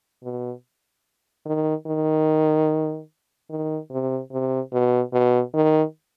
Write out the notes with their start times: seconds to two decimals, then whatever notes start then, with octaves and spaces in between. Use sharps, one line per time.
0.23 B2
1.46 D#3
1.86 D#3
3.50 D#3
3.91 C3
4.31 C3
4.72 B2
5.13 B2
5.54 D#3